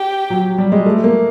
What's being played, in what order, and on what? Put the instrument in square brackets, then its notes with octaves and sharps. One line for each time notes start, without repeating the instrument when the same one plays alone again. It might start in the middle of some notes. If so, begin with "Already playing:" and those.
Already playing: [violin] G4
[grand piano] F#3
G3
G#3
A3
A#3